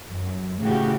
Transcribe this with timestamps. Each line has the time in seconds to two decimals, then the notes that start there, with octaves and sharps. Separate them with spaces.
0.11 F#2
0.62 A2 C#3 F#4 G4